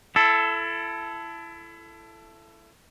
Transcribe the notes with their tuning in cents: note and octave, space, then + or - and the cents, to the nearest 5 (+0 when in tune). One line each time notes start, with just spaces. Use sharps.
E4 +30 A4 +0